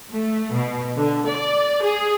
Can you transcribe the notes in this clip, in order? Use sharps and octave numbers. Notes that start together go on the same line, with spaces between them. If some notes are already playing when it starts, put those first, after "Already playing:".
A3
B2
D3
D5
G#4